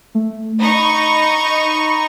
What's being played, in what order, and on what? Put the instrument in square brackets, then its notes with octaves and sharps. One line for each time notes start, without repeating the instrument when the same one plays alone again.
[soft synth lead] A3
[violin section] D#4 C#6 [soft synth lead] B5